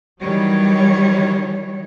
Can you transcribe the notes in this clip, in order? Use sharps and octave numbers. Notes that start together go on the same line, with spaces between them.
D#3 E3 F#3 G3 C#5